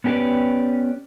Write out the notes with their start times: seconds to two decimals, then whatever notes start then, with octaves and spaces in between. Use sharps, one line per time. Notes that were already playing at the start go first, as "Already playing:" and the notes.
0.04 B3 C#4 G4 A#4 B4 D5